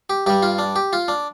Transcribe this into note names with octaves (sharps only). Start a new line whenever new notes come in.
G4
G2 G3 G4
F4
D4
G4
F4
D4